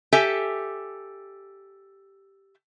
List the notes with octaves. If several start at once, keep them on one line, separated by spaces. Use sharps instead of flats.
G4 A4 E5 G#5